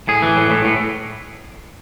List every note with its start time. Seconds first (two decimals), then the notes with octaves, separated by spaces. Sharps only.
0.08 A2 G#4
0.22 E3
0.37 A2
0.51 A2
0.65 A2